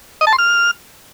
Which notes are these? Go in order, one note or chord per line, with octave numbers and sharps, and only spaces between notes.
D#5
A5
C6
F6